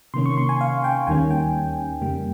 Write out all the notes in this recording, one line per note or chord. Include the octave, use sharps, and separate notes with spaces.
C3 D#3 A#3 C#4 C6
C#6
C6
G#5
F5
G5
D#2 D#3 G3 A#3 C#4 G#5
G5
F2 C#3 G3 A#3